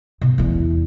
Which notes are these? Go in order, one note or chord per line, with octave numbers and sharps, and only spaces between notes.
B2
E2 E4